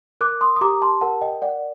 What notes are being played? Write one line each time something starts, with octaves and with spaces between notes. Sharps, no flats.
A#4 D6 F#6
C6 D#6
D#6
G4 A#5 D6
A5 C6
A#4 F#5 A5
D#5 G5
D5 F#5